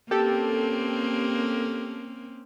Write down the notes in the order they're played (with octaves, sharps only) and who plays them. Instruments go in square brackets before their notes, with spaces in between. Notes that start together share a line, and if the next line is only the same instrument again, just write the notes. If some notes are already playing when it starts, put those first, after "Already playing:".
[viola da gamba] A#3 C4 C#4 [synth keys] G4 A4